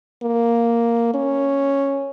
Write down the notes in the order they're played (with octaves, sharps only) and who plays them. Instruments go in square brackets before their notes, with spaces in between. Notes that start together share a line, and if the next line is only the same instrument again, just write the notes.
[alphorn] A#3
C#4